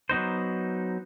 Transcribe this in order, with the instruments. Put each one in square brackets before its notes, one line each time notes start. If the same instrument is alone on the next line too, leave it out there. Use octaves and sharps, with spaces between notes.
[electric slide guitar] F#3 B3 D#4 C5